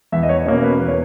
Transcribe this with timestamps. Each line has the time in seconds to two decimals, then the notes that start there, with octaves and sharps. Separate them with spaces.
0.12 E2 E5
0.23 D#5
0.29 C#5
0.46 B2 A#3 C#4 C#5
0.63 B4
0.79 E2 B4
0.88 C#5